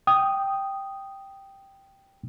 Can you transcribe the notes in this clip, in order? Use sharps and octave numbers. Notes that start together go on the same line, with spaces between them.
G5 D#6